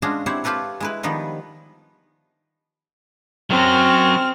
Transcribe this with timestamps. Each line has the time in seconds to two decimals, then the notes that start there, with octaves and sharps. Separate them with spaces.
0.02 G#3 C#4 D4 F4 F#4 G#4
0.26 C4 E4 G4 C5 C#5 F#5
0.44 F4 G4 A4 B4 C#5
0.80 G#3 E4 B4
1.03 D#3 F3 G3 B3
3.50 F#3 C4 C#4 F6